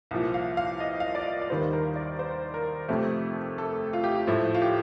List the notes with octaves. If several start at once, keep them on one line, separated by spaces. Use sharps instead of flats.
C2 A#2 F3
F5
F5
D#5
F5
D#5
D5
D5
D#2 D#3 G3 C5
A#4
D5
C5
A#4
F2 C3 F3 A3 G4
A4
F4
G4
F4
A2 F3 A3
F4
G4